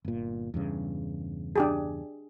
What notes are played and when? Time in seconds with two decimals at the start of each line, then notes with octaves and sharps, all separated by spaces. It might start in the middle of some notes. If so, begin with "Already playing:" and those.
0.05 G1 A#2
0.54 E2 G2 C#3
1.56 D4 G4 G#4